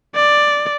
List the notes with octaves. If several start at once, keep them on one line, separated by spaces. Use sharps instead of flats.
D5